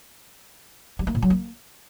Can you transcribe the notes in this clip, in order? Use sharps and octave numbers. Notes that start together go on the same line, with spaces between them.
G3
A#3
A#2
F#3
A#3